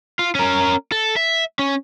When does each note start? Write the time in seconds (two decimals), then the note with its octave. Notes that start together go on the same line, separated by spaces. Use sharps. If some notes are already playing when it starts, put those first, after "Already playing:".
0.19 F4
0.35 C#4 A#4
0.92 A4
1.16 E5
1.59 C#4